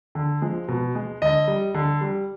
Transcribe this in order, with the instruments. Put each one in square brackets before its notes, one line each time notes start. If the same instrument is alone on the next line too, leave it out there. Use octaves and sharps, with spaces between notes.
[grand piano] D3
F3 G#3
B2
G#3
D3 D#5
G3
D3
G3